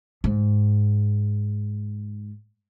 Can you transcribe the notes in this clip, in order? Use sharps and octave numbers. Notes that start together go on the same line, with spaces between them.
G#2